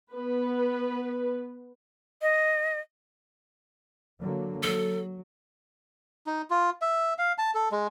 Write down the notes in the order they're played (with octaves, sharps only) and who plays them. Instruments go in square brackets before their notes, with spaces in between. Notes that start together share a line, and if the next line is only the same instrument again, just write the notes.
[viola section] B3 B4
[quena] D#5
[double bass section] D3 F#3 A#3
[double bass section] F#3 [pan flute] A4
[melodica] D#4
F4
E5
F5
A5
A4
G#3